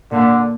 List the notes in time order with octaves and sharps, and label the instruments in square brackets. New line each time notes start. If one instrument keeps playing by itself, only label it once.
[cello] A#2 [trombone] D3